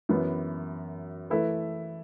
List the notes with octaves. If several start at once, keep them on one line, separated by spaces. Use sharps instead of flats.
F#2 E3 B3
E3 A3 E4 B4